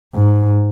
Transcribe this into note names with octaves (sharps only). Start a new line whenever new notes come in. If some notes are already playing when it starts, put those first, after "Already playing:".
G#2